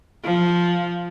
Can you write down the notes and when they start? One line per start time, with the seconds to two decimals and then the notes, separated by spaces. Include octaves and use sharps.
0.23 F3